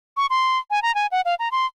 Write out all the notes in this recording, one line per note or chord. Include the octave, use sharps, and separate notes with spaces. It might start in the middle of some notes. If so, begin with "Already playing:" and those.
C#6
C6
G#5
A#5
G#5
F#5
F5
A#5
C6